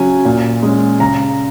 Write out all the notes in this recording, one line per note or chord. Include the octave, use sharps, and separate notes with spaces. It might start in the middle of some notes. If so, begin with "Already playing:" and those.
Already playing: C#3 F#3 C#4 G#5
A#2
G#3 C#4
C#3 A#5